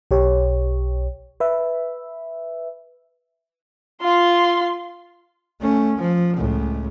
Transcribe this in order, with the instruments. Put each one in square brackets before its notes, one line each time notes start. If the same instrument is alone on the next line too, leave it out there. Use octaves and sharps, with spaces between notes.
[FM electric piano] B1 G4 C#5
B4 E5
[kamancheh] F4 C6
[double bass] A3 C#4
F3
C#2 A2